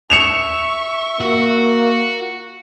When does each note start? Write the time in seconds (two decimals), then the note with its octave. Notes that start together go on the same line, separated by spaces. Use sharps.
0.10 E5 C#6 C#7 E7 F7
1.21 A#3 F#4